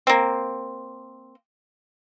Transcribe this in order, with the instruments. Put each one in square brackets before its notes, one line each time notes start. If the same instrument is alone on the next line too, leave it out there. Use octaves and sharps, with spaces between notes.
[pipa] A#3 C4